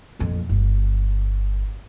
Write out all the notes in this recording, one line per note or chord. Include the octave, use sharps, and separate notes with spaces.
A#1 F2
G1